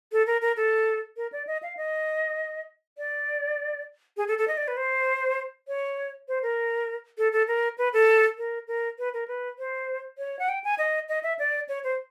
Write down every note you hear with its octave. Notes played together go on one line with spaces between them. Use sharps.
A4
A#4
A#4
A4
A#4
D5
D#5
F5
D#5
D5
G#4
A4
A4
D#5
D5
B4
C5
C#5
C5
A#4
A4
A4
A#4
B4
A4
A#4
A#4
B4
A#4
B4
C5
C#5
F#5
G5
G#5
D#5
D#5
E5
D5
C#5
C5